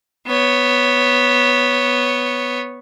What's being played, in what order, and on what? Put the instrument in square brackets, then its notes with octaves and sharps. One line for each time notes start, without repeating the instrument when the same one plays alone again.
[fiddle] B3 C#5